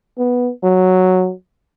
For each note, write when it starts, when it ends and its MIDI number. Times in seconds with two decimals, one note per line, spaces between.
0.18 0.51 59
0.63 1.32 54